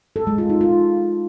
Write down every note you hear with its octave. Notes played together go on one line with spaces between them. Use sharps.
A4
G#3
F4
D#4
F4